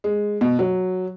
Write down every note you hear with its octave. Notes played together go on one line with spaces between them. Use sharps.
G#3
B2
F#3